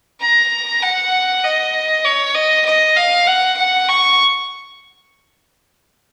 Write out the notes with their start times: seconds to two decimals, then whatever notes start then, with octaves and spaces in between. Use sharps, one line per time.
0.21 A#5
0.82 F#5
1.44 D#5
2.05 C#5
2.35 D#5
2.66 D#5
2.96 F5
3.27 F#5
3.58 F#5
3.89 C#6